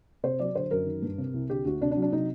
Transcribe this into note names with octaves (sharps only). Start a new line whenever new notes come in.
C3 C5
F#3 D5
D3 C5
F#2 A#4
D#3
G2
C3
C2
D3 G4
D2 F#4
C3 D4
D4
F#3
D4
C3 D#4